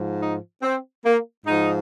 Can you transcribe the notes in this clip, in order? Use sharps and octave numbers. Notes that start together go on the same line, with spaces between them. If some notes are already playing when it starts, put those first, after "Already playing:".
Already playing: G#2 F3
D#4
C4
A#3
G#2 F3 D#4